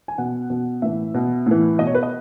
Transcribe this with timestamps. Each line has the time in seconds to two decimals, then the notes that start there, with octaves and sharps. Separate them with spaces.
0.08 G#5
0.18 B2 F#5
0.50 B2
0.82 A2 E3 E5
1.14 B2
1.46 A2 E3
1.79 B2 D#5
1.87 C#5
1.95 B4
2.03 D#5